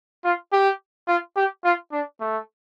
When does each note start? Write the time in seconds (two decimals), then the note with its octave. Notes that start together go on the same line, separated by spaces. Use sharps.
0.24 F4
0.52 G4
1.08 F4
1.36 G4
1.64 F4
1.92 D4
2.20 A3